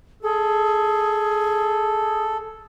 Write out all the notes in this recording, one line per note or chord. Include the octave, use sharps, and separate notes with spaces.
G#4 A4